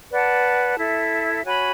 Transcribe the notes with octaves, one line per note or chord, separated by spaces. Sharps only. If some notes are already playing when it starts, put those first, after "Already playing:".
B4 D5 F#5 A5
E4 A4 E5
F#4 C#5 G#5 B5